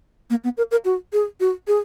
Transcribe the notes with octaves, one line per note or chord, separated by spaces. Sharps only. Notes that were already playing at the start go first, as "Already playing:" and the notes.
A#3
B3
A#4
A#4
F#4
G#4
F#4
G#4